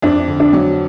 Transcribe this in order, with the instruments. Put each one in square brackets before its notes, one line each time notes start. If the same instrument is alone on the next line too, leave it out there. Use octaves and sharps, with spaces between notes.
[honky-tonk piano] F2 [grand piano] D4
[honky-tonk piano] D3
[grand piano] D4
[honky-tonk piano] F#3